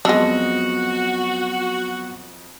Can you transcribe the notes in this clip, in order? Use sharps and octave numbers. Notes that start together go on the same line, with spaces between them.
F2 F#3 G#3 B3 D4 F#4 D#5 E6